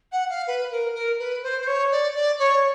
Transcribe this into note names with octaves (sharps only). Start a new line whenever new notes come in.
F#5
F5
B4
A#4
A#4
B4
C5
C5
C#5
D5
D5
C#5